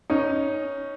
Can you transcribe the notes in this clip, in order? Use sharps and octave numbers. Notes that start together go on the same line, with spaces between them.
C#4 D#4